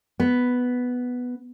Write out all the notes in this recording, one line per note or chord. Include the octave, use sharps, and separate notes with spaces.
B3